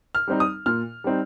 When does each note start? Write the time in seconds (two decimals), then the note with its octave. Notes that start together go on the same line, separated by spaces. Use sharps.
0.15 F6
0.28 G3 C4 D#4
0.40 D#6
0.66 A#2 F6
1.04 G3 C4 D#4